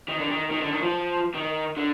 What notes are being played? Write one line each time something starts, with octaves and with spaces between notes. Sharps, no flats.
D#3
D3
D#3
D#3
D3
D#3
F3
D#3
D3